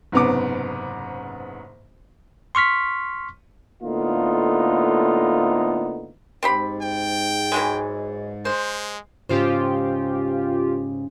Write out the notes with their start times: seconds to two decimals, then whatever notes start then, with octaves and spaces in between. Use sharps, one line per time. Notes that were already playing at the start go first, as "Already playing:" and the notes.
0.12 F#1 G#2 C3 B3 C#4 D6
2.55 C6 C#6 F6 B6
3.83 A2 D3 A#3 B3 D#4 F4
6.43 G#2 C4 G4 B5
6.82 G5
7.52 E3 F#3 G#3
8.45 G#3 C5
9.29 G#2 C#3 F4 G4 C5